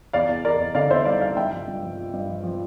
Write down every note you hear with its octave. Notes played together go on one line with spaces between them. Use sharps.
E2 D5 F5
E2
E2 A#4 D5
E2
D3 D5 F5
E2 C5 E5
G3 D5 F5
G3 D5 F5
G2 E5 G5
F3
G2
F3
F3
G2
F3
F3